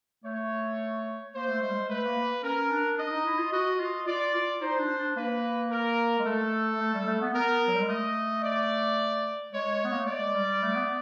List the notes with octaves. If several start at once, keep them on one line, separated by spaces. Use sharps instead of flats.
A3 C#5
A#3 C5
A3
G#3
G3
G#3
A3 B4
A#3
C#4 A#4
D4
D4 D#5
D#4
E4
F4
F#4 D#5
F4
F4 D5
F4
D#4 C5
D4
D4
A#3 B4
A#4
G#3
A3 A4
A3
G3
A3
B3
B3 A#4
F#3
G3
G#3
A3 D#5
D5
G#3 C#5
B3
A#3
A3
G#3 D5
G#3
G3
A3
B3